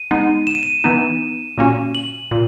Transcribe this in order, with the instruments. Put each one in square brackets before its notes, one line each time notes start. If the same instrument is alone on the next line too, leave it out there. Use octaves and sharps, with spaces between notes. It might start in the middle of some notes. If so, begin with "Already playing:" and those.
Already playing: [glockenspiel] D#7
[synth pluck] G#3 B3 D#4
[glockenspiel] E7
D#7
E7
[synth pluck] E3 B3 D#4
A#2 A#3 C#4 F#4
[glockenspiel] F#7
[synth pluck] A#2